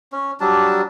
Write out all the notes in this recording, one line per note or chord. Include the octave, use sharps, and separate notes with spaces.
C#4
F#3 G3 D4 A5